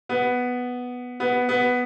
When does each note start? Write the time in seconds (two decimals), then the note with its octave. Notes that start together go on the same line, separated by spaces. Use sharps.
0.09 B3
1.20 B3
1.49 B3